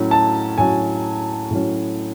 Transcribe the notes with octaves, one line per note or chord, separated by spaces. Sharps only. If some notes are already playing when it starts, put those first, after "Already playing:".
Already playing: A2 F#3 C#4
A5
A2 F#3 C#4 G#5
A2 F#3 C#4